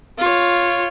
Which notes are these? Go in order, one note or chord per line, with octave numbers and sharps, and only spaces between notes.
F4 C#5